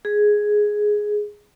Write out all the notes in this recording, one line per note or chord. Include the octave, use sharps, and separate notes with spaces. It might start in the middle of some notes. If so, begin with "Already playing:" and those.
G#4